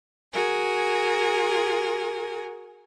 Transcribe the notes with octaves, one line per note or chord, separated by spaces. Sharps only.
F#4 G#4 A#4 G#5